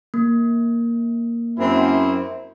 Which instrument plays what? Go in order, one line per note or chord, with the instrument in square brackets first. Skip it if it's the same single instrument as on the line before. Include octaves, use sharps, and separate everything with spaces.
[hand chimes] A#3
[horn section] F#2 C4 E4